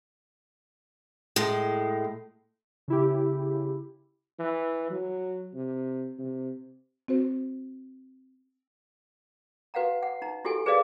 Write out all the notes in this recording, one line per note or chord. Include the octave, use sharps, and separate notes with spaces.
A2 G#3
C#3 E4 G4
E3
F#3
C3
C3
C4 F#4 C5
F#4 B4 F5 F#5 A#5
F#5
D#4 A#5
E4 F#4 G4 A4 G#5
G#4 B4 C5 D5 D#5 F5